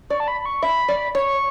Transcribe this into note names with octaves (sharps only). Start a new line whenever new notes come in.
D5 C#6
A5
B5
B5
C#6
E5 B5
D5
C#5 C#6